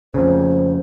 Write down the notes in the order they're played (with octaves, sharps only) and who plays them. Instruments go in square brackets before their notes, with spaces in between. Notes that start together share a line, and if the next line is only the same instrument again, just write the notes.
[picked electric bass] F2 C#3 [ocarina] C5